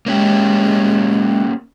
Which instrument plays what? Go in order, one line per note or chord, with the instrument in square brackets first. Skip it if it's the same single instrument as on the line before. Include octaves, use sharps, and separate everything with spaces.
[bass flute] G#3 [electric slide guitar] A#3 C#4 G4